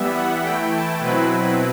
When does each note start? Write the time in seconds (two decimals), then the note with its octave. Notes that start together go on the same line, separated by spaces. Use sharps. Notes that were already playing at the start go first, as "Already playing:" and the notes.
Already playing: E3 G3 B3 E5
0.13 F#5
0.42 E3 A3 E4 G5
0.72 A5
0.99 B2 F#3 C4 E4 B4